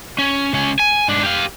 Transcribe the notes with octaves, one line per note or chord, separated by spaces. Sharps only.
C#4
C#2 C#4
G#5
G#2 D4
G4 F5